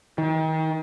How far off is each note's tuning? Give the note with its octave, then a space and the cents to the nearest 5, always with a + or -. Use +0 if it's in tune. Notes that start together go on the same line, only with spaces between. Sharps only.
D#3 +35